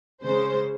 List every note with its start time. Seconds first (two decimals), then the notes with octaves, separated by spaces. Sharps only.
0.23 C#3 G#3 C5